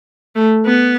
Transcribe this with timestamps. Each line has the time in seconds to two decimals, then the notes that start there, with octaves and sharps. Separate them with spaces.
0.36 A3
0.66 B3